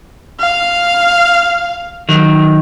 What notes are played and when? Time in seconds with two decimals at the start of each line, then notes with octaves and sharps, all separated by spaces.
0.39 F5
2.09 D#3 F#3